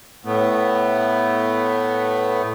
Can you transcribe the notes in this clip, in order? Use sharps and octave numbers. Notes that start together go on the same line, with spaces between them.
A2 A3 B3